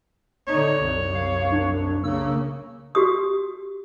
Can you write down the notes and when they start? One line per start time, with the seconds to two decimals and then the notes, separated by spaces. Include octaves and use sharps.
0.48 D3 D#4 C#5
0.80 C2 F#2
1.15 F5
1.52 D4
2.04 C#3 A#3 E6
2.95 F#4 G4 D#6